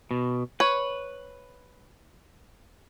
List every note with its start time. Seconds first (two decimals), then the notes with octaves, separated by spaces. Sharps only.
0.11 B2
0.60 B4 C#5